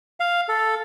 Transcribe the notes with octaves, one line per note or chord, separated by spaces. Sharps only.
F5
A4